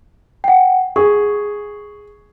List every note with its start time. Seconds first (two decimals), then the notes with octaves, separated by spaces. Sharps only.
0.44 F#5 G5
0.96 G#4 C#6